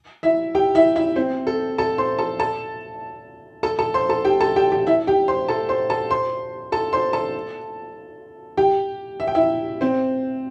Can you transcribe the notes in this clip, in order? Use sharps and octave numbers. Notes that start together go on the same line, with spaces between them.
E4 E5
G4 G5
E4 E5
E4 E5
C4 C5
A4
A4 A5
C5 C6
A4 A5
A4 A5
A4 A5
A4 A5
C5 C6
A4 A5
G4 G5
A4 A5
G4 G5
G4 G5
E4 E5
G4 G5
C5 C6
A4 A5
C5 C6
A4 A5
C5 C6
A4 A5
C5 C6
A4 A5
G4 G5
E5
G5
E4 E5
C4 C5